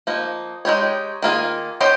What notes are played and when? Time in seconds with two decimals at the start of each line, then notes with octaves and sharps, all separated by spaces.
0.07 F3 A#3 D#4
0.65 G#3 D#4 G4 C#5
1.22 D#3 A#3 F4 G#4
1.80 C#4 G4 C5 D#5